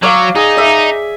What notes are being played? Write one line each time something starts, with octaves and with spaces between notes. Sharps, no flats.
F#3 D5 F5 D6
D#4 G#4
D5 E5